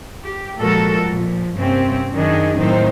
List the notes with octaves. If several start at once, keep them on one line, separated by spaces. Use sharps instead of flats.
G4
A#2 F3 G#3 F#4 A4 A#4
A#2 F3
G2 C3 A#3 C4 C#4
F#2 D#3 D4 D#4 G#4 D#5
A2 D#3 F#3 C4 D#4 C5